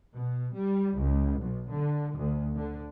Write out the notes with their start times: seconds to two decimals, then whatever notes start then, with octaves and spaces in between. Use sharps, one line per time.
0.14 B2
0.54 G3
0.98 C#2
1.42 B1
1.72 D3
2.17 D2
2.57 D3